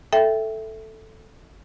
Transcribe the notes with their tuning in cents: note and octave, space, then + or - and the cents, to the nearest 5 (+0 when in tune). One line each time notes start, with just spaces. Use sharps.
A4 +0 E5 +0 G5 +0